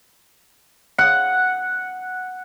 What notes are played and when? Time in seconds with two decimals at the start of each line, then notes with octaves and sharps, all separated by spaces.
0.98 F#5